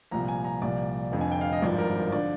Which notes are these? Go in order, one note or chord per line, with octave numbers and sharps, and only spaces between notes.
C2 A#2 F3 A#5
G#5
A#5
C2 A#2 F3 D5
F1 F2 D3 F3
G#5
G5
F5
D#5
G#1 G2 F3 D5
A#4
D3 F3 D5